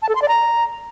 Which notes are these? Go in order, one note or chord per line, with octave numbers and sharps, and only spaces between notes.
A5
A4
C6
D5
A#5